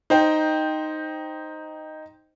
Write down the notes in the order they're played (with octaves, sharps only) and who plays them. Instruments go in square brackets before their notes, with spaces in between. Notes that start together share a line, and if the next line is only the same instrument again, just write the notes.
[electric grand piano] D#4 C5 G5